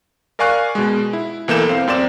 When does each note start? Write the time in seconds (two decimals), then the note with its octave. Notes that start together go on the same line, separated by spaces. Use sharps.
0.39 A#4 D5 F5 G#5 C#6 F#6
0.75 B2 G#3
1.13 E4
1.48 B1 E3 A#3 A4 G6 E7
1.69 C4 F5
1.87 F#2 C4 D5 E7